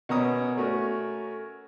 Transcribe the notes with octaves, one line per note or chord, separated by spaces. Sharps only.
B2 A#3 B3 C#4 A#5 D#6
A3 C#4 F#4 A#4